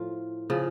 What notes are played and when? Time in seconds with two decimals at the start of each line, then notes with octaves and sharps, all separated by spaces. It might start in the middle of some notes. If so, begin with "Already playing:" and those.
Already playing: A2 F3 F4
0.50 C#3 F3